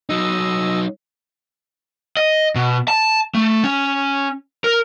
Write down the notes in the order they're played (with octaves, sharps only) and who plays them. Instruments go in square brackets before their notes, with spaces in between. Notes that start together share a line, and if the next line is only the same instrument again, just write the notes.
[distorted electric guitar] F#3 D#4 [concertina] D#5 E6
[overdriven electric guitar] D#5
B2
A5
A3
C#4
A#4